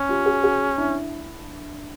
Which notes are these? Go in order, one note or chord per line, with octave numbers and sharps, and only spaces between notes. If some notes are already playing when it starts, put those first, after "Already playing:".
Already playing: C#4
F4 G4
F#4 G#4
F#4 G#4
D4 E4